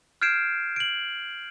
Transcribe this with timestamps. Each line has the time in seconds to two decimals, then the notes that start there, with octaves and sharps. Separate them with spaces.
0.22 F6 G6 G#6 C7 D7 E7
0.76 D7 F#7